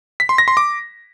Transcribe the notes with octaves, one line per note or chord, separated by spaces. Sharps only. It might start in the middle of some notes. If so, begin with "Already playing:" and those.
B6
C6
A#6
C6
D6